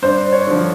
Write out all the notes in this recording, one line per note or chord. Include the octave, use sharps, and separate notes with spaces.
G2 C5
C#5
D3 F3